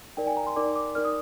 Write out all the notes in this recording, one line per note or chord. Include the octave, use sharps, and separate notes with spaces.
D#4 A#4 D5 G5
G#5
A#5
C6
D#4 A#4 D5 D6
D6
D#4 A#4 D5 F6
D#6